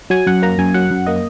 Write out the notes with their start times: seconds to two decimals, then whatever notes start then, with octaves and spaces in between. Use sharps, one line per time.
0.10 F#3 G#5
0.27 F#2 F#5
0.42 A#3 A#5
0.58 F#2 G#5
0.74 F#3 F#5
0.91 F#2
1.07 A#3 D#5